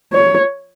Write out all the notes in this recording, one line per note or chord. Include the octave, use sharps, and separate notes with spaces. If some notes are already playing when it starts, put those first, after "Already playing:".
C#5